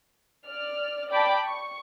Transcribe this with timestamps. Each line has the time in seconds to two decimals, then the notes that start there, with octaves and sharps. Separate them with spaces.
0.47 D5 F6
1.10 D5 G5 A5 B5 D6
1.46 C#6